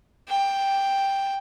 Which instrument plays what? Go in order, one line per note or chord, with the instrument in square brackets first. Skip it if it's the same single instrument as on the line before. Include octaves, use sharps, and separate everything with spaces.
[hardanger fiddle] G5